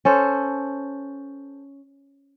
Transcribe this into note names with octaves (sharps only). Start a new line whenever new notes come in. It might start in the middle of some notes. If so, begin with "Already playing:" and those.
C#4 A4 C5